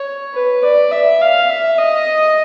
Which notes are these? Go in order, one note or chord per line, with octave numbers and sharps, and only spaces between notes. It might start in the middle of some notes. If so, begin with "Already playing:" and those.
Already playing: C#5
B4
D5
E5
F5
E5
D#5